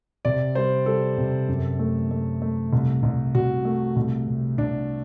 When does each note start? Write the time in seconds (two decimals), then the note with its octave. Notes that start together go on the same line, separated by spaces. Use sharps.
0.25 C3 D5
0.55 G3 C5
0.86 G3 A4
1.18 C3
1.48 F#2
1.79 A3
2.11 A3
2.42 A3
2.73 C2
3.03 C2
3.35 C2 F#4
3.65 A3
3.96 C2
4.27 C3
4.58 C2 D4